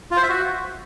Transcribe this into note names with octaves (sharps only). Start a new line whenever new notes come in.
F4
C5
E5
F#4